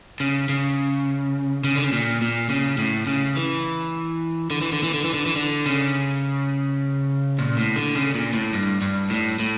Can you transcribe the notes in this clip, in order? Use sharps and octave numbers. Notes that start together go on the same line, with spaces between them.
C#3
C#3
C#3
D3
C#3
A#2
A#2
C#3
A2
C#3
E3
D3
E3
D3
E3
D3
E3
D3
E3
D3
C#3
A#2
A2
D3
C#3
A#2
A2
G2
G2
A2
A2